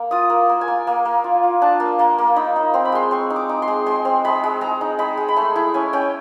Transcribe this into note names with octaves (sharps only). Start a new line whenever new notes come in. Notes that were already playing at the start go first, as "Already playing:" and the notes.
Already playing: A#3
F4 D#6
A#3
A#3
G#5
A#3
A#3
A#3
F4
F4
D4 A5
A#3
A#3 A#5
A#3
D#4 B5
D#4
C4 C6
B5
G#3 C6
C4 C#6
D#4
D6
D#4
C6
G#3
G#3 C6
C4
G#3 B5
G#3
G#3 A#5
D#4
G#3 B5
G#3
B5
A3 C6
E4 B5
C#4 G#5
C#4 G5